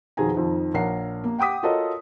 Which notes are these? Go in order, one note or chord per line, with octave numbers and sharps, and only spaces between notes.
F2 B2 D#3 G#4 G#5 A#5
F2 D#3 F3
A#1 A#4 C#5 F#5 C7
A#3
F#5 G5 D6 D#6 B6
F4 F#4 A4 A#4 C#5 D#5